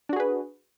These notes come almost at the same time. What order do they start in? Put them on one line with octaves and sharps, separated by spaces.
D4 F#4 G#4 B4